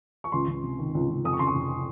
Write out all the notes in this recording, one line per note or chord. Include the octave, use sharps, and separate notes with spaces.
C#6
C#2 C6
C#2
C3
D#3
C#2
C#2
F2 D#6
C#6
C#3 C6
C#6
F1